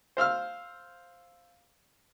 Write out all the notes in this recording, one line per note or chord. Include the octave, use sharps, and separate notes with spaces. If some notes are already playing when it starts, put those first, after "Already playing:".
C5 F5 E6 F6